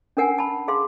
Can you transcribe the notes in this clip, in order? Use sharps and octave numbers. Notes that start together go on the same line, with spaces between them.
C#4 D4 A#4 F#5 G#5
A5 B5
G#4 F5 C6